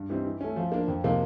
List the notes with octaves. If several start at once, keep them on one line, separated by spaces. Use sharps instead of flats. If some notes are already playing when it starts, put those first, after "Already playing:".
Already playing: G2
E3 G3 C4 D#4
E3
A3 C#4
F3
A#3 D4
F2
C3 F3 A#3 D#4